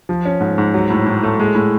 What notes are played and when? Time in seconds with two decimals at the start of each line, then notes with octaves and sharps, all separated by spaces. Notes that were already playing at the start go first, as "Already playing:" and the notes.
0.09 F3
0.25 C#4
0.41 G#2
0.58 G#2
0.74 F#3
0.90 A2
1.07 A2
1.23 A3
1.40 G#3
1.55 A2